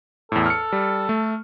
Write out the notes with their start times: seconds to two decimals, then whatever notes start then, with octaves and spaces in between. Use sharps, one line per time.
0.32 E2 A2 A4
0.46 F6 C#7
0.72 G3
1.09 A3